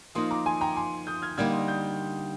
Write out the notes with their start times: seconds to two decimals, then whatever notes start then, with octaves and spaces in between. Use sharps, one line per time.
0.15 F3 A#3 D#4 C6 D#6
0.31 A#5 D6
0.46 G#5 C6
0.61 G5 A#5
0.76 G#5 C6
1.07 D#6 G6
1.22 F6 G#6
1.37 D3 G3 A#3 D#4 F6 G#6
1.52 C6 D#6
1.68 D#6 G6